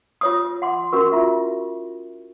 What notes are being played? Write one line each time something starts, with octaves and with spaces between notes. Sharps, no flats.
F4 C#5 D#6
F#5 C6 D6
C#4 F#4 A#4 C#6
E4 F4 E5